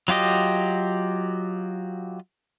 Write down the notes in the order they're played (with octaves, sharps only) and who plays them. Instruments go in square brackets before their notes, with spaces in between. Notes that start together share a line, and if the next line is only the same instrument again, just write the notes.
[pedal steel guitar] F#3 F4 G4 D#5